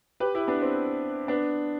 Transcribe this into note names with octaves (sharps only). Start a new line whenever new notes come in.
G4 B4
E4 G4
B3 D4
C4
B3 D4